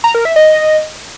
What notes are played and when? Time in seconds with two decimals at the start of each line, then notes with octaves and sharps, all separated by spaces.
0.04 A#5
0.15 A#4
0.25 E5
0.36 D#5